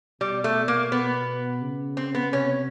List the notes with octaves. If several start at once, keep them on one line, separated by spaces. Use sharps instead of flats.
B2 G3
A3
A#3
B3
C#3
C4
B3
C3 C#4